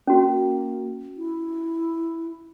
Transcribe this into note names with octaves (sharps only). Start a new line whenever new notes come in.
A#3 C#4 F#4
E4